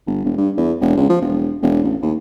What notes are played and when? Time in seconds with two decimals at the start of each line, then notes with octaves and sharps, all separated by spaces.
0.06 G1
0.24 E1
0.37 G2
0.57 E2
0.81 E1
0.97 C#2
1.09 F3
1.21 E1
1.62 E1
1.83 A1
2.02 D#2